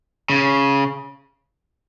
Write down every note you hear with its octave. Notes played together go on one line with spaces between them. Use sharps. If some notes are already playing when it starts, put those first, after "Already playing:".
C#3